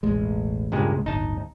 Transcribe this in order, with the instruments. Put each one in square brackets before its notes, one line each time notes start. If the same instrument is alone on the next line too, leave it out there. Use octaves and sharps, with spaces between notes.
[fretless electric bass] E1 A1 G#3
[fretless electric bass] C#2 [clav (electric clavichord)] G2 A#2 G#3
[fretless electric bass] D1 G1 [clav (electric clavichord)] D#4 A5